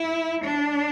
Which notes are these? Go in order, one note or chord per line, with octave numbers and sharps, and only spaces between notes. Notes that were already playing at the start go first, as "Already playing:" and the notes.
Already playing: E4
D4